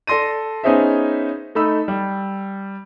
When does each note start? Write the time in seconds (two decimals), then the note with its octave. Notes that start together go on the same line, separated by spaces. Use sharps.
0.07 A4 D5 C6 A#6 D#7
0.64 B3 C#4 D#4 G#4 C5 E5
1.55 A3 D#4 B5 E6
1.88 G3